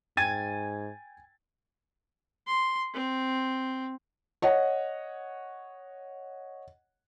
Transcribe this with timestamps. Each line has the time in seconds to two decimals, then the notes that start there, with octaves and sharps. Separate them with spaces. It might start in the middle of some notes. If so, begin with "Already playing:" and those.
0.17 G#2 G5 G#5 G#6 A6
2.47 C6
2.94 C4
4.42 C#5 D#5 F#5